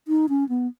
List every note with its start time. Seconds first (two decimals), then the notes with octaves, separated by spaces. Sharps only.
0.08 D#4
0.29 C#4
0.49 B3